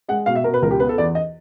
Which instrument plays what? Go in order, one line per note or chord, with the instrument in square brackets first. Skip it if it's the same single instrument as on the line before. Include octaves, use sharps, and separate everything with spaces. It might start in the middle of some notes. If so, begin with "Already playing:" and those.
[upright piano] G#3 F#5
B2 F5
E5
B2 A#4
B4
C#2 A#4
G4
B3 B4
A4
E2 D5
D#5